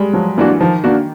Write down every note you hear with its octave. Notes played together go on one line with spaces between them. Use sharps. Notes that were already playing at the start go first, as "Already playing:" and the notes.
Already playing: G3 G#3
F3 F#3
E3 A#3 D4 F#4
D#3 F3
A#3 D4 F#4